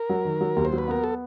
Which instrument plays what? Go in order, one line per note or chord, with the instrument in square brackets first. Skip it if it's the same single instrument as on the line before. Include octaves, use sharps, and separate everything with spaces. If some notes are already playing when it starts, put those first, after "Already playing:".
Already playing: [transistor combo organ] A#4
[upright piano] F#3
D#3
F#3
D#2
[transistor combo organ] C5
[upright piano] F#3
[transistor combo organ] B4
[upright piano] B3 [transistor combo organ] A#4
[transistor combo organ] A4